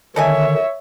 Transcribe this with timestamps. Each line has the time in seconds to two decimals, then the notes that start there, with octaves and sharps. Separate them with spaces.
0.16 D3 D#3 A4 C#5 D#5 E5 G#5